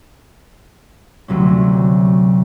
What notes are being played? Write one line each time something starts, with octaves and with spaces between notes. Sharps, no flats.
D2 C3 F#3 C#4